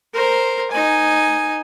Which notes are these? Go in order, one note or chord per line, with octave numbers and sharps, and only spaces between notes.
A#4 C5
D#4 G#5